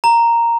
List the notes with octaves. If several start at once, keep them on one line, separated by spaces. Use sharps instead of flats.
A#5